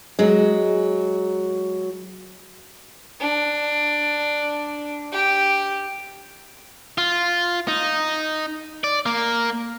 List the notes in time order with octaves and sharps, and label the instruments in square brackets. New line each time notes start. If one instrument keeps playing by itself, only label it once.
[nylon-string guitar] F#3 G#3
[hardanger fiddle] D4
G4
[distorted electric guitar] F4
D#4
D5
A#3